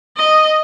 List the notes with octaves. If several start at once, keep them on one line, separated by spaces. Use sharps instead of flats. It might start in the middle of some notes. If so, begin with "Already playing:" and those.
D#5